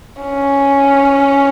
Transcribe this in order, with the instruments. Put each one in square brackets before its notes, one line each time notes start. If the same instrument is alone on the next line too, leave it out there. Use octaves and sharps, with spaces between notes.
[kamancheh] C#4